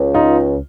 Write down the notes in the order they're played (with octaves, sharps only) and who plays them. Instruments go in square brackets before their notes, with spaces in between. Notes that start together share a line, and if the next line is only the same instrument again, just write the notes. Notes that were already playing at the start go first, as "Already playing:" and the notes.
Already playing: [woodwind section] C#2
[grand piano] D#4 F4